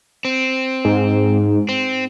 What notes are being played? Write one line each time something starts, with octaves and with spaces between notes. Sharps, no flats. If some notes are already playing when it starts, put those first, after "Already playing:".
C4
G#2
C4